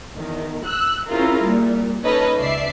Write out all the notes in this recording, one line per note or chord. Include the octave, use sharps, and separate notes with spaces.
E2 D#3
E6 F#6
C4 C#4 E4 F4 G#4 A#4
A#2 G3
C#4 D#4 A4 B4 C#5 D#5
C#2 D5 E5 C7